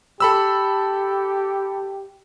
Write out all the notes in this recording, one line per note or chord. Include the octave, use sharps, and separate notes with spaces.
G4 A4 B5 E6